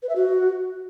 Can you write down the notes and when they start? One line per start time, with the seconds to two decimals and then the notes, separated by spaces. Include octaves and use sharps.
0.03 B4
0.09 E5
0.16 F#4